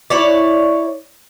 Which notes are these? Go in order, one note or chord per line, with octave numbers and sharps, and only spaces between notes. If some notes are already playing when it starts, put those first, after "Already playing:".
E4 C#5 D5